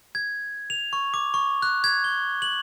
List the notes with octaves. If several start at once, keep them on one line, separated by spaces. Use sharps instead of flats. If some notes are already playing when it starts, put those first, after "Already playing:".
G#6
F7
C#6
D6
C#6
F#6
G#6
G7
F#7